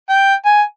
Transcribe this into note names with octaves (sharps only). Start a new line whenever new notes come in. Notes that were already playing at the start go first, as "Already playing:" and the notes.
G5
G#5